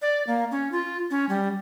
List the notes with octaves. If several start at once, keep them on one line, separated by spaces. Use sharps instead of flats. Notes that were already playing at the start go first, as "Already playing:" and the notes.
D5
A#3
C#4
F4
C#4
G3